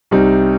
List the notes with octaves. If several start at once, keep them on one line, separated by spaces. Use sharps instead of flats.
C2 C3 G3 C4 D#4